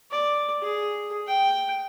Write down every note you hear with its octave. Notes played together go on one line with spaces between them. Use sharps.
D5
G#4
G5